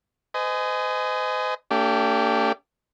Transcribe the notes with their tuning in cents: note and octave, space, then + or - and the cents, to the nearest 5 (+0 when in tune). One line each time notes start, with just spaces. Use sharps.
C5 -45 D#5 +0 G#5 +10
A3 +45 D4 -40 G4 +0